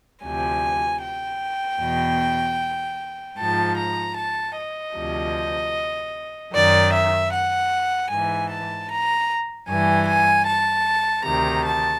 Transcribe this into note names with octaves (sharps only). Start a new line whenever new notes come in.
D2 C3 F3 G#5
G5
E2 B2
G#2 F3 A5
A#5
A5
D#5
D2 C3 F3
F#2 D#3 D5
E5
F#5
G#2 E3 G#5
A5
A#5
G2 E3 G#5
G#5
A5
D2 C3 D#3 A#5
A5